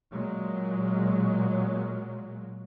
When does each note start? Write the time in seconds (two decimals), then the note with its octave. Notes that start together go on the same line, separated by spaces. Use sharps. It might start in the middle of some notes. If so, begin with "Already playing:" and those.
0.11 A#2 F#3 G#3